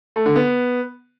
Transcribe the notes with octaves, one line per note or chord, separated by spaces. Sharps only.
A3
D3
B3